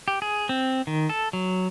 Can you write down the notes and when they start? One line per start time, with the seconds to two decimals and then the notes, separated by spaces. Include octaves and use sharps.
0.08 G4
0.22 G#4
0.49 C4
0.87 D#3
1.10 A4
1.33 F#3